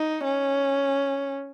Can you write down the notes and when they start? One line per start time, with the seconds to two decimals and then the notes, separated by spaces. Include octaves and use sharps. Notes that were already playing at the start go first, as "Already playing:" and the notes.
Already playing: D#4
0.24 C#4